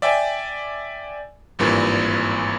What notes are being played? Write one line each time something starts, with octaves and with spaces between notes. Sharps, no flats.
D5 E5 G5 G#5
G#1 G2 A#2 E3